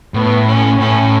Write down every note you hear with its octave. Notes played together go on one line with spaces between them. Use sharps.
A2 B3
C#4
A2 C#4